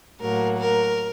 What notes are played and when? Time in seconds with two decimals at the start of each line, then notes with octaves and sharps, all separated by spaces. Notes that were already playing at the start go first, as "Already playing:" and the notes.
0.21 A2 F#3 A#3 A#4
0.58 A#4